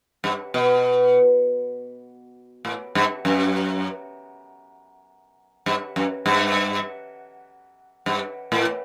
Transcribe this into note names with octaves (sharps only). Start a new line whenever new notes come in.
G2
B2
A2
G2
F#2
G2
F#2
G2
G2
A2